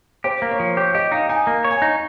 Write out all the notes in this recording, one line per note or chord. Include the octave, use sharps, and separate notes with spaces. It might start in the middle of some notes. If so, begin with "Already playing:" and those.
G4 C5
A#3
C#5
F3
G4 C#5
G4 D#5
D#4 F5
D#4 G#5
A#3
C#5
G#5
D#4 A#5